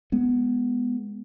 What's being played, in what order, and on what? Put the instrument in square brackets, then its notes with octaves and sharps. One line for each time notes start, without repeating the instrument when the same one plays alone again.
[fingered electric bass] G#3 B3